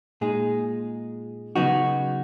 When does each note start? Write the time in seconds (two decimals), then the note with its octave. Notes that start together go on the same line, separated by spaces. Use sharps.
0.21 A#2 G#3 D#4 G#4
1.56 C#3 F#3 B3 D#4 F#4